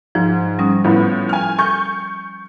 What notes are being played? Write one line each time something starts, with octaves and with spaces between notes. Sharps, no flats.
G#2 F3
G3 C#4 D#6
A2 F3 B3
G#5 F6
C#6 G6